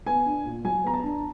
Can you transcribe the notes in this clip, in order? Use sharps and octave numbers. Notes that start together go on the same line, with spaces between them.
B3 G#5
D4
A#2
F#3 G#5
B3 A#5
A5
D4